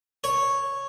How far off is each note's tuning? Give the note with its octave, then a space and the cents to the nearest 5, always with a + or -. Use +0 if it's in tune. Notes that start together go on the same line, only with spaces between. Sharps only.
C#5 -5